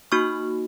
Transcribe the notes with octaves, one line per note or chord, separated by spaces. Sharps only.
A#3 D#4 F#4 C#6 F6